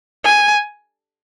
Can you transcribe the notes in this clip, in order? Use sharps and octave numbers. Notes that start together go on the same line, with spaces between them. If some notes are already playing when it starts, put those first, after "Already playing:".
G#5